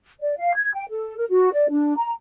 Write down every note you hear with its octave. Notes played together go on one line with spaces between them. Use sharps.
D5
F5
G#6
G5
A4
A#4
F#4
D5
D4
A#5